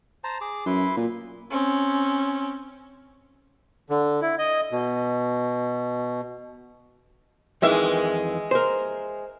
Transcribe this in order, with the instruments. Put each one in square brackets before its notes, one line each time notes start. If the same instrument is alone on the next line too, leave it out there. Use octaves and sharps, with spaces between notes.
[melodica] C5 A5 A#5
G#4 D6
[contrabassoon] F#2 [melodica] E4 B4 C6
[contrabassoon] A#2
[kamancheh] C4 C#4
[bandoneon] D3
E4
D#5
B2
[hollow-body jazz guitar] F2 D#3 E3 [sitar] G#3 E5
[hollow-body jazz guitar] A#4 C5